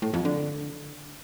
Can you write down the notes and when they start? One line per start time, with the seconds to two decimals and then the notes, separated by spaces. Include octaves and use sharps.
0.02 A2
0.14 F2
0.25 D3